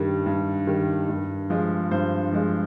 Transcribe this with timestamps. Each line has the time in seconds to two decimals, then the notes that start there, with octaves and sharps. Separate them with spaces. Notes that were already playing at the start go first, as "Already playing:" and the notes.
Already playing: G2 D#3 G3
0.26 G2
0.67 D#3 G3
1.09 G2
1.50 F3 G#3
1.91 G2 C5
2.32 F3 G#3